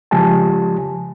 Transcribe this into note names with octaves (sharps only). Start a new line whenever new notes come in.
C#3 F3 G#3 G4 G#5 A5